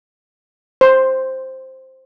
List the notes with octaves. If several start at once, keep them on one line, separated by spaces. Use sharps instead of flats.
C5